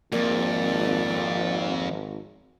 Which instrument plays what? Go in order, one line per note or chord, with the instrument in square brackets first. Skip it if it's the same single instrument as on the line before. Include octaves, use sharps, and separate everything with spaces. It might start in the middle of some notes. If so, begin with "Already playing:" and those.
[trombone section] G#1 [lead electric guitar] F2 [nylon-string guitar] A#3 [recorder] D5